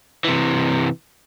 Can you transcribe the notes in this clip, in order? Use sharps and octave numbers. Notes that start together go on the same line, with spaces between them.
C3 E3